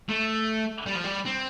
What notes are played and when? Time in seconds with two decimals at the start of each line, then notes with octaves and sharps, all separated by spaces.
0.09 A3
0.86 G3
0.95 F3
1.04 G3
1.26 C4